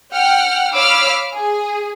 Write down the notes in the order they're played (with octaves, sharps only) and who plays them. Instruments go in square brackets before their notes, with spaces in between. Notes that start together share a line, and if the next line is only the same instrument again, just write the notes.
[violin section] F#5 G5 F6
C#5 F5 B5 D6 E6 F6
G#4